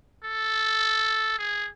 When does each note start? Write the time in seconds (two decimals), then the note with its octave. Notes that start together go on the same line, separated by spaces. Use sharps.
0.24 A4
1.39 G#4